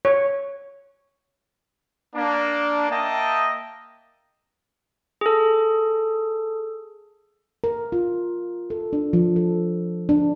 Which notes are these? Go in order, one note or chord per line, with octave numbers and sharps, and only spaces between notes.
C#5
A#3 D4
A#3 D#5 E5 G5 A5
G#4 A4
A#4
F4
A4
D4
F3
A4
D4